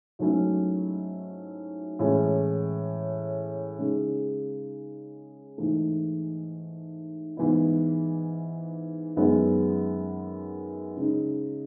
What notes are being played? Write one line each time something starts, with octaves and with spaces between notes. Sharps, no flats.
G#2 F#3 A3 C#4 E4
A2 E3 G#3 C#4
C#3 G#3 D#4
G#2 E3 A3
G#2 E3 B3 E4
F#2 D#3 G#3 B3
C#3 G#3 D#4